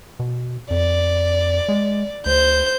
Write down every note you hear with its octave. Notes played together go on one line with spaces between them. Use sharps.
B2
F2 D5
G#3
D2 C5 G6